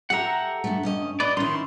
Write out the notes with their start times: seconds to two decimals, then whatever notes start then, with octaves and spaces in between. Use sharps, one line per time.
0.10 G4 A4 E5 F#5 A#5
0.64 G2 A3
0.83 G2 C#4 D#5
1.20 B4 D5 D#5
1.37 D#3 C#4 D#4 E4 C6